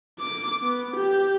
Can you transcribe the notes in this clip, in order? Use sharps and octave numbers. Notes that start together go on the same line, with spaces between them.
D6
B3
G4